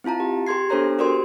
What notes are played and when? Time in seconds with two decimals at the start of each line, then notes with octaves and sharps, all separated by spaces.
0.04 C4 E4 F4 A5 A#5
0.20 G4
0.47 G4 G#4 C6 G#6 C7
0.70 B3 D4 A4 C5 C#5 A#5
0.99 F#4 G4 A#4 C5 D5 C6